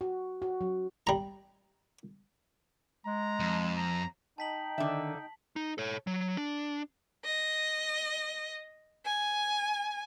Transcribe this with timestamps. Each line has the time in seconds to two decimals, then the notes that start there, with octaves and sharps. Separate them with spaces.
0.01 F#4
0.42 F#4
0.61 F#3
1.07 G3 A#5
3.06 G#3 A#5
3.40 F2
3.77 A#5
4.38 D#4 G5 A5 B6 F#7
4.78 D3 D#3 D4 E5
5.56 D#4
5.78 A4 C#5
6.07 F#3
6.37 D4
7.25 D#5
9.05 G#5